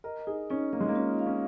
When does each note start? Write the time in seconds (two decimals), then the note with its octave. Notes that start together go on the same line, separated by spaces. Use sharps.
0.04 A#4 D#5
0.27 D#4 G#4
0.50 C#4 D#4
0.73 A#3 D#5
0.81 G#3
0.89 A#3
0.95 C#4 F4
1.19 F5
1.27 C#4